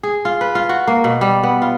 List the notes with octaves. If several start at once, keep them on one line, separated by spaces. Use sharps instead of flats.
G#4
F4
B4
F4
F#4
A#3
B2
G3
B3
F4